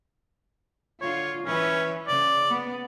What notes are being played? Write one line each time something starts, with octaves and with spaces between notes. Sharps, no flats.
D3 F4 C#5
E3 C#4 B4 C#5
C#3 D5
B3